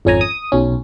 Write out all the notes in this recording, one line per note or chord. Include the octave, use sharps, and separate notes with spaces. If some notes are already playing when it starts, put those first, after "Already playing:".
G#1 F2 C#4 C#5 G#5 A#5
D#6
B1 C#4